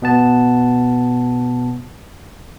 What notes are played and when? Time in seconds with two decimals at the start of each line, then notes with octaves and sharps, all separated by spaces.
0.02 B2 B3 A5